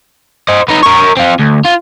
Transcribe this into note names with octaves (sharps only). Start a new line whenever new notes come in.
C5 D#5
B3 D#4
A#4 C#5
C4 F4
D2
F4